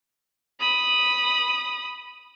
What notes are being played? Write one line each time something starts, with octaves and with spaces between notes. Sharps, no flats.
B5 D#6